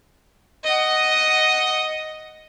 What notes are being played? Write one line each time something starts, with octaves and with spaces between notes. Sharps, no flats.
D#5 F#5